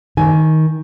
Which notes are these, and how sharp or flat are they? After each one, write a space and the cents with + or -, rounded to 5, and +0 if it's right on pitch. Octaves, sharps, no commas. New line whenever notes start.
D#3 +15 G#5 +20